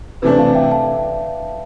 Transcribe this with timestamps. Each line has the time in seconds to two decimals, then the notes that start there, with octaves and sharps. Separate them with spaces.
0.22 C3 E3 A3 D4 B4
0.38 F5 A5
0.55 E5 G5
0.71 F5 A5